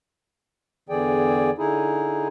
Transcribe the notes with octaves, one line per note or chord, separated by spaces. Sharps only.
E2 D3 E3 G#4 D5 G5
D3 D#4 E4 G#4